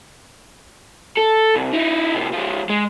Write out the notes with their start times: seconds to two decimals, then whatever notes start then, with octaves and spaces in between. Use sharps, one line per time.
1.17 A4
1.55 C2
1.73 D#4 E4
2.15 A2 C3
2.33 F3 G#3
2.70 G#3